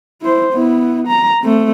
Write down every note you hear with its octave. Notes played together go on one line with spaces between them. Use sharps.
E4 C5
B3 E4
A#5
A3 C4